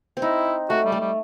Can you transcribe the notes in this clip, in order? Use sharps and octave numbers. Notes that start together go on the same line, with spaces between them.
C4
D#4 E4
A3 F#4
G3
A3
G3